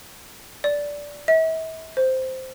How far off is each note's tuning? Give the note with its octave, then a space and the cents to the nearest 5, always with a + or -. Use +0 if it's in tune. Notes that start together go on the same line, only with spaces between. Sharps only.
D5 -10
E5 -40
C5 -5